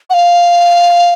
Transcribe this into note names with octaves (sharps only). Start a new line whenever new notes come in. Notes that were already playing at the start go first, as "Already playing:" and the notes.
F#5
F5